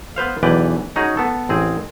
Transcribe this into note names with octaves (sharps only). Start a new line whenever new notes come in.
B3 B4 C5 F5
B1 E2 E3 B4 D5 G5
C#4 D#4 F#4 G#4
B3 A4
A1 C4 G#4